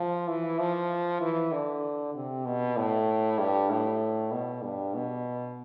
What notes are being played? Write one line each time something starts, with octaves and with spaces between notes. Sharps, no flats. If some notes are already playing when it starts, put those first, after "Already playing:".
Already playing: F3
E3
F3
E3
D3
C3
B2
A2
G2
A2
B2
G2
B2